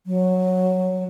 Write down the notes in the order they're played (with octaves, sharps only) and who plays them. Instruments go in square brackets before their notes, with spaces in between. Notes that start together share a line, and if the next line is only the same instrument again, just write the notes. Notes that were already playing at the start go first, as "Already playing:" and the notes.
[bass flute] F#3